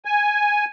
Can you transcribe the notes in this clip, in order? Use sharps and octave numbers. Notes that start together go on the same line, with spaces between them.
G#5